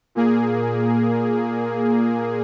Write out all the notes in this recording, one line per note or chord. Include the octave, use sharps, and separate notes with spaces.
A#2 A#3 G#4